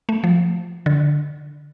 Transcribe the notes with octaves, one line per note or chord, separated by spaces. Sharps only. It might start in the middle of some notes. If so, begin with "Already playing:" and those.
A3
F3
D3